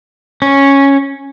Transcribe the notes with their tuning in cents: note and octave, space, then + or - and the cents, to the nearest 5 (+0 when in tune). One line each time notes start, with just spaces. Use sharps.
C#4 -5